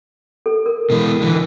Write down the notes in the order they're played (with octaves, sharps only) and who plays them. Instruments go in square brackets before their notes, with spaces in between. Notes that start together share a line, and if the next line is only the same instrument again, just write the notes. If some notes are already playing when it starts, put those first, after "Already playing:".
[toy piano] A4
A#4
[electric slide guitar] B2 E3 G#3
D3 E3